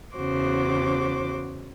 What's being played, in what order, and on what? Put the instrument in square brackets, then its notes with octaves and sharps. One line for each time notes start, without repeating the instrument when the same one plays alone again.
[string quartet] E2 C#3 F#4 C5 D6